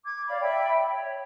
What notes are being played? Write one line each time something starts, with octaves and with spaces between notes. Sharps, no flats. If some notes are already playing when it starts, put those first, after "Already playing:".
D6 G#6
C#5 D5 F5 B5
E5 G5 B5
C#5